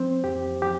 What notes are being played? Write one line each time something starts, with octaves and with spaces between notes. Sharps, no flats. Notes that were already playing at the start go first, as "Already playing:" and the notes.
Already playing: F3 C4 C5
F2 G4
F3 G4